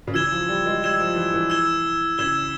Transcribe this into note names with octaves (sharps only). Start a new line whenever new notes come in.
C#3
E3 E6 G#6 E7 G7
F3
G3
G#3
G3 E6 G#6 E7 G7
F3
E3
E3
E6 G#6 E7 G7
C#3 E6 G#6 E7 G7